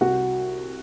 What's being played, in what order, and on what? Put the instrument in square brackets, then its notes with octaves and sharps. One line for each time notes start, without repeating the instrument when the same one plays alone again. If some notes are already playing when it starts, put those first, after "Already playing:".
[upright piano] C2 F#4